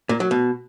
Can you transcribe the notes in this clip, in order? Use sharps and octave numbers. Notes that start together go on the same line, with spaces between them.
A#2
F#3
B2